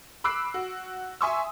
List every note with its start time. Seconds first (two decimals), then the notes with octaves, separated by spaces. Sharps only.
0.24 B5 D6 E6 F#6 C7 D7
0.54 F#4
1.21 E5 G#5 C6 C#6 D#6 E6